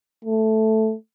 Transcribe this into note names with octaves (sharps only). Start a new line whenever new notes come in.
A3